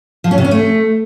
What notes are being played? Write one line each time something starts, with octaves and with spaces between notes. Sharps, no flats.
F3
C#4
C3
C#4
A3